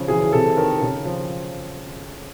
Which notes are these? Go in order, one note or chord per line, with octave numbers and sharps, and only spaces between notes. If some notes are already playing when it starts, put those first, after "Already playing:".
Already playing: C#3 F3
E3 G#4
C3 A4
D#3 A#4
C#3
F3